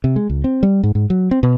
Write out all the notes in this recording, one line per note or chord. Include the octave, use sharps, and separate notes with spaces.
C3
G#3
C#2
C4
G3
G#2
G#2
F#3
C4
B2